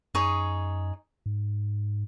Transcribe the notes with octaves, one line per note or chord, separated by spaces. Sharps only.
F#2 D#4 G#4 C#5
G#2